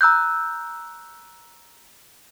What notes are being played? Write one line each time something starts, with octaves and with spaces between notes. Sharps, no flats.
A#5 E6 F#6 G6